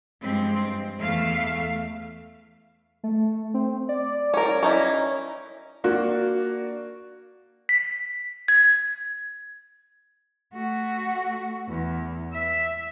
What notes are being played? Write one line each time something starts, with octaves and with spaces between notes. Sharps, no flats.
G2 F3 G#3 C4
E2 A3 E5 F5
A3
C4
D5
C#4 A#4
C#4 D#4 E4
A#3 D4 F#4
B6
G#6
A3 F#4
E2
E5